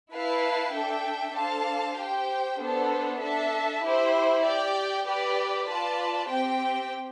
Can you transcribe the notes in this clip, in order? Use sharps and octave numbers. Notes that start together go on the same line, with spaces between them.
E4 B4 F5 A5
D4 A4 E5 G5
D4 A4 C5 F5 A5
G4 C5 G5
B3 D4 A4 C5
D4 A4 E5 A5
E4 G4 C5
G4 D5 G5
G4 B4 D5
F4 B4 D5 A5
C4 G4 C5 G5